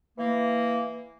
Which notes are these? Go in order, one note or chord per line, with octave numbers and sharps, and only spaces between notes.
E3 A#3